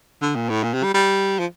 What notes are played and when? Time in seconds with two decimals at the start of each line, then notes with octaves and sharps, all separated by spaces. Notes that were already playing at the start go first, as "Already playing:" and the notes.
0.22 D3
0.36 A#2
0.49 A2
0.64 A#2
0.74 C3
0.84 G3
0.94 G3
1.39 F3